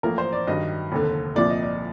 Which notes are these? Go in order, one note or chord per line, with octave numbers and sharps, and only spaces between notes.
A1 A2 F3 A#3 A#4
C5
D5
G2 D#3 F#3 D#5
F1 D#2 D3
C2 A#2 F3 D5
D#5
D5